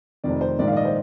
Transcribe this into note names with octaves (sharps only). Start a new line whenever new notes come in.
F1 F2 D#3 D5
C5
A#1 G#2 D#3 D5
F5
D5
D#5
C5